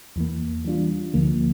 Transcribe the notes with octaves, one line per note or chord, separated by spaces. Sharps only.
E2 E3 A#3
E3 G3 D4 F4
D2 D3 F3 A#3